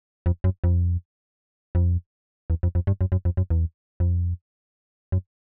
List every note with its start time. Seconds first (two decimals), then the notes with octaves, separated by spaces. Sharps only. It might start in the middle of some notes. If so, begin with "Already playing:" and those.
0.26 F2
0.44 F#2
0.64 F2
1.75 F2
2.50 E2
2.63 F2
2.75 F2
2.87 G2
3.01 F#2
3.12 F#2
3.25 F2
3.37 F#2
3.50 E2
4.00 F2
5.12 F#2